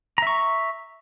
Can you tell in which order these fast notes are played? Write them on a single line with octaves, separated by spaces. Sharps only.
A#5 E5 C#6